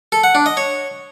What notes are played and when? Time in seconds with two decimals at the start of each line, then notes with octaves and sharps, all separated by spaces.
0.12 A4
0.24 F#5
0.35 D4
0.46 D#5
0.57 C#5